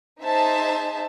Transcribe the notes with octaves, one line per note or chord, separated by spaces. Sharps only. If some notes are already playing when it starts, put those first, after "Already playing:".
D#4 G#4 C5 E5 A5